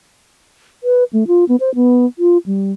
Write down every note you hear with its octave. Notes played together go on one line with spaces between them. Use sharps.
B4
A3
F4
B3
C5
B3
F4
G3